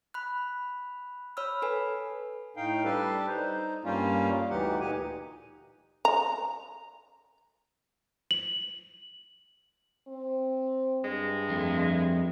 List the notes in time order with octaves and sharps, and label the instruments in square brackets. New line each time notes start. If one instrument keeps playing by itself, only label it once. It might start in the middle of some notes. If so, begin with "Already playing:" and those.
[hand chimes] B5 F#6
C#5 B5 E6 F6
A4 B4 G#5
[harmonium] A2 D#4 F5 G5
G3 D4 G4 A4 B4
D#4 C5
G2 G3 A#3 C#4 F4
D2 E3 D#4 G4 F#5
A#2 D#4 G4 G#5
[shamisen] A#5
[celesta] F#7
[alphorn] C4
[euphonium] G2 [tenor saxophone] G#3
[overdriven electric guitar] F2 [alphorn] A3